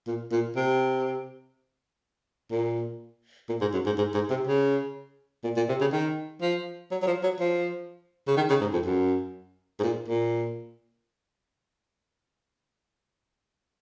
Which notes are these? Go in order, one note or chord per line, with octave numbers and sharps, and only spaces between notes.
A#2
A#2
C3
A#2
A#2
G#2
F#2
G#2
G#2
G#2
C3
C#3
A#2
A#2
C3
C#3
D#3
F3
F#3
F#3
F3
F#3
F3
C#3
D#3
C#3
G#2
F2
F#2
G#2
A#2
A#2